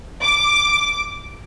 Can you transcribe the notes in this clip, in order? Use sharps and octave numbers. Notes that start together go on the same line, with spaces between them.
D6